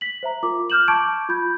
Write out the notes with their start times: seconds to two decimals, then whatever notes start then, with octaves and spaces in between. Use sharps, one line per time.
0.01 B6 F#7
0.23 C5 E5 A#5
0.43 F4 A#4 D6
0.70 D6 F6 G6 E7 F#7
0.88 A5 C#6 D6 G6 G#6 D7
1.29 F4 B5 G6 G#6